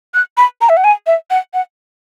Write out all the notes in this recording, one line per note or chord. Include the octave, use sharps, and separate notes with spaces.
F#6
B5
A#5
E5
F#5
G#5
E5
F#5
F#5